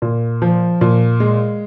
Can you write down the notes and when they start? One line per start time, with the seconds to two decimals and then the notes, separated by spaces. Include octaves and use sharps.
0.02 A#2
0.42 F3
0.81 A#2
1.20 G#3